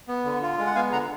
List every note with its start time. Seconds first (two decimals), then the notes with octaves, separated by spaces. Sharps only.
0.08 B3
0.25 D3
0.42 F4
0.59 G#3
0.67 F#5
0.75 B3 F5 G#5
0.92 D3 F#5 A#5